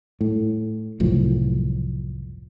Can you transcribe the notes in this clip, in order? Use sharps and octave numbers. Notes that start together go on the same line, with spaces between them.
A2
F#1 C2 A2 F3